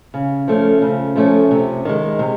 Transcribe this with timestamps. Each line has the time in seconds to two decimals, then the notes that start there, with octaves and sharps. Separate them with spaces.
0.14 C#3
0.48 F3 A3 C#4
0.82 C#3
1.16 F3 A3 C#4
1.51 C3
1.85 D#3 G#3
2.19 C3